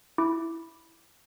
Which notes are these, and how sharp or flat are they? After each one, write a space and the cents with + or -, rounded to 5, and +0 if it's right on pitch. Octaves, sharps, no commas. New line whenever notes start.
E4 +0 D6 +0